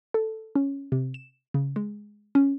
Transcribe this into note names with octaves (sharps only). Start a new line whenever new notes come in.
A4
C#4
C3
E7
C#3
G#3
C#4